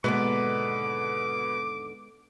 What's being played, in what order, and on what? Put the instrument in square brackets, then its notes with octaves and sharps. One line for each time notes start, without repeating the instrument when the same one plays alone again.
[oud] D#2 G#2 D3 [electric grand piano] B2 B4 [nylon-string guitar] G#3 B3 [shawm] D6